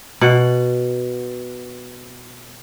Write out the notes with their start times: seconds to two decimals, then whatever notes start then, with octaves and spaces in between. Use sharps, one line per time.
0.21 B2 F#5